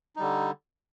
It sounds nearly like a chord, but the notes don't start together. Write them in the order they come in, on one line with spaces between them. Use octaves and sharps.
D#4 G3 D3